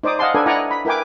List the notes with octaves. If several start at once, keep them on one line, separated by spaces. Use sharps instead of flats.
D#4 C5 D5 D6 D#6
D#5 F5 F#5 G#5 A5 C6
D4 A4 B4 D5 G#5
E4 D5 D#5 F#5 G#5 A#5
B5
E4 A#4 B4 G5 G#5 D6